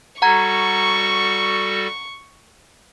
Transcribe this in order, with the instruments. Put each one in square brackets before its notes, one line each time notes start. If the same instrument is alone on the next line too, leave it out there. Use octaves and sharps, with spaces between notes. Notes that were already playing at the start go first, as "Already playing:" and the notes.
[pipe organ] G3 F#4 A4 [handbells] F#5 A#5 G#6 [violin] C#6